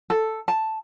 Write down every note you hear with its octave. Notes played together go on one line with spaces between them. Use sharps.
A4
A5